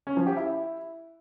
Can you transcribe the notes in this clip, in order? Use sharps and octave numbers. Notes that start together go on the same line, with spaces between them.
C#4
F3
G4
E4